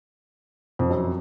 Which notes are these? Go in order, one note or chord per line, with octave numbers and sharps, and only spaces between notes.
F2
F#2